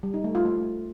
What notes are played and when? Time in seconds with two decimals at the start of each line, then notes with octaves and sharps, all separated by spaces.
0.03 G3
0.14 D#4
0.24 A3
0.35 F4
0.45 A3